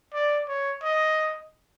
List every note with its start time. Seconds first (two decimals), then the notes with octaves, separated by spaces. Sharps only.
0.14 D5
0.48 C#5
0.83 D#5